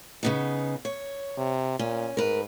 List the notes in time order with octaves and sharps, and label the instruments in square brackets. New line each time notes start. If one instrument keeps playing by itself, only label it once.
[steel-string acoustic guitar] C#3 B3 D#4
C#5
[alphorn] C3
[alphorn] A#2 [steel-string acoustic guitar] C#4
[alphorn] G#2 [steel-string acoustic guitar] A#4 B4